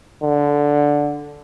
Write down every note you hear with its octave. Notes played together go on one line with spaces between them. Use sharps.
D3